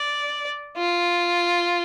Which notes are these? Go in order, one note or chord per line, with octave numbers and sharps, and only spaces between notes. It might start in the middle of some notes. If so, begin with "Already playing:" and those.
Already playing: D5
F4